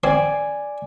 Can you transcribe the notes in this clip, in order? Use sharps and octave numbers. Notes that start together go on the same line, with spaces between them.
C4 D5 G#5 C6